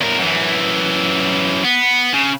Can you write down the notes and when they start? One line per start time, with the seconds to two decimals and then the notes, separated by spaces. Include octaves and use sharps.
0.01 E2 A#4
0.19 F#2 E3
1.64 B3
2.14 C#3